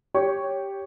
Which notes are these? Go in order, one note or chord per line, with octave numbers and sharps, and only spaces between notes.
G4 C#5 C#6